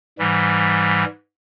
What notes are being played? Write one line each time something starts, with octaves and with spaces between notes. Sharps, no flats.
G#2 E3 G3